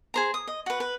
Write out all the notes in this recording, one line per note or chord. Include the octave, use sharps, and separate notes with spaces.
G#4 C5 A#5
D#6
D#5
F#4 B4
B4